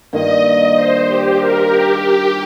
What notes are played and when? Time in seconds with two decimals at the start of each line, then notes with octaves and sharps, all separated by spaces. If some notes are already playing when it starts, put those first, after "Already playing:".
0.12 G2 D#3 A#3 F4 D#5
0.44 D#5
0.75 C5
1.07 G4
1.37 A#4
1.69 G4
1.99 G4